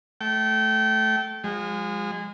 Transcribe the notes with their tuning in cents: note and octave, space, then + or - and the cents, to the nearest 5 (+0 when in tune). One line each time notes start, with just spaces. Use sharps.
A3 -20 G5 -30
F3 +30 G#3 -25